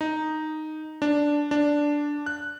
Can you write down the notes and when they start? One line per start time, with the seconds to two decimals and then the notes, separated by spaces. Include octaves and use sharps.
0.01 D#4
1.02 D4
1.51 D4
2.26 F#6